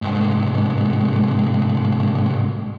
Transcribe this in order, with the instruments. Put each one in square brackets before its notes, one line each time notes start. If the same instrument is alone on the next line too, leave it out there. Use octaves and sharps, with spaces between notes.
[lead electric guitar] C2 G#2